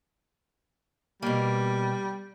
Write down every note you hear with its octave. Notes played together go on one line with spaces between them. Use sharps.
B2 G3 A#3